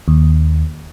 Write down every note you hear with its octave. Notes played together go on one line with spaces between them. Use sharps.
D#2